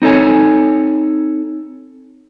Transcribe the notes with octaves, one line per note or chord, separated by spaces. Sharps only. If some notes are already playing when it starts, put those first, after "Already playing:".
C4 D#4 A4 C#5 G#5